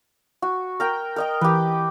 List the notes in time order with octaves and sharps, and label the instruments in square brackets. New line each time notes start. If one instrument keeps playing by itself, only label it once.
[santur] F#4
A#4 G5
A#4 D#5 G5
[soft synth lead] E3 [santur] G4 B4